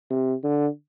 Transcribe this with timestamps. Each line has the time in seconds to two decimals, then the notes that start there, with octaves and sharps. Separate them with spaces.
0.10 C3
0.44 D3